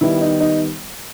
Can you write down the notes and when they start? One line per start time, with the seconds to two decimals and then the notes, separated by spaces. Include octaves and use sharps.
0.01 D#3 G3 B3 E4
0.21 D#4
0.40 D#4